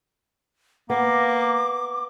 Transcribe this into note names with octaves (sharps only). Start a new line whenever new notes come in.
A#3 B3 D6